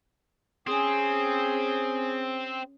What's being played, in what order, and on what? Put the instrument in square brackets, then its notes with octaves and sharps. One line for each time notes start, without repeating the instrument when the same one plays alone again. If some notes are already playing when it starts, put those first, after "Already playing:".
[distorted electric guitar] C4 [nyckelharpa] C#4 G#4 [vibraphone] G#5 D#6